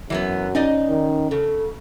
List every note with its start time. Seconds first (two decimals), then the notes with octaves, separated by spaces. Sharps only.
0.10 F#2 E3 F#3 B3
0.55 C#4 D#4 D5 D#5
0.89 D#3
1.31 C#3 A4